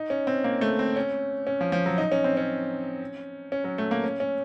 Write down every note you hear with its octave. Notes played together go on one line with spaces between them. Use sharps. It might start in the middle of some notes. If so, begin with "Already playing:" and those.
Already playing: D#4
C#4
C4
A#3
A3
C4
C#4
C#4
F3
F3
F#3
D#4
C#4
C4
C#4
C#4
F#3
A3
A#3
C#4
C#4